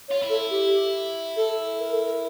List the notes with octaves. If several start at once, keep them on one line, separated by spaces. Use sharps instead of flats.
C#5
F4
E4
A4
G4
A4
A#4
A4
A#4